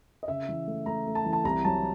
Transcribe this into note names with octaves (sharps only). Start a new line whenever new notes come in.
D#5
C#3 E5
E3
A3
A3 A#5
A3
A5
E3
A5
C2 A#5
F#3 A5